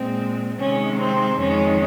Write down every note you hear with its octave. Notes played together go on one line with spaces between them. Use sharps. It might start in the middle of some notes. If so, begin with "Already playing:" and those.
Already playing: A#2 G#3 C4
C3 D#3 G#3 C#4
C4
F2 D#3 G#3 C#4